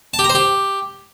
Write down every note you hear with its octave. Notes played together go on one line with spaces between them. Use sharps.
A5
G4
A#5
C5
G4